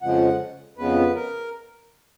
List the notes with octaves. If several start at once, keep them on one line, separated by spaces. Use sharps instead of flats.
F2 C#3 F3 G#3 F#5
F2 C#3 G#3 B3 B4
A#4